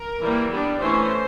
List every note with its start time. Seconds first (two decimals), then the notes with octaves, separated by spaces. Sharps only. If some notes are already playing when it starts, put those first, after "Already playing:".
Already playing: A#4
0.21 E3 G3 A#3
0.51 G3 B3 D4
0.81 E3 A3 C#4 C5